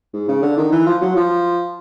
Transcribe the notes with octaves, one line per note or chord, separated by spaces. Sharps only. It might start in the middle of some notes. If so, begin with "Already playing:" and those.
G#2
C#3
D3
D#3
E3
F3
F#3
F3